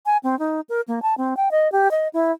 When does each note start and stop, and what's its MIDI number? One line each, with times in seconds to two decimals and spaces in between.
0.06 0.17 80
0.23 0.38 60
0.39 0.61 63
0.69 0.81 70
0.88 1.02 58
1.02 1.14 81
1.17 1.36 60
1.37 1.51 79
1.51 1.70 75
1.72 1.91 67
1.91 2.08 75
2.13 2.32 64